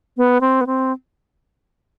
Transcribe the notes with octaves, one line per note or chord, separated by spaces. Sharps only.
B3
C4
B3
C4